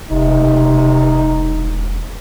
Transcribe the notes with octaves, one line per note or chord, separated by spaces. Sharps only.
E1 C3 D#4